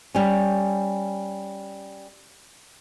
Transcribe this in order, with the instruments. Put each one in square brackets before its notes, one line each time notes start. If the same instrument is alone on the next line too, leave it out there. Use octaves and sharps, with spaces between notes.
[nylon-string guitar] G3 C#4